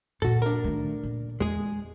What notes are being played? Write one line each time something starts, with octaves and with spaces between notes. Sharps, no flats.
A#2 F4 F#4 A4
D4 A#4
D#3 A3
A#2
E2 G#3 G#4